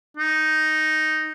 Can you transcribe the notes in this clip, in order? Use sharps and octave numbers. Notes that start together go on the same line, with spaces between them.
D#4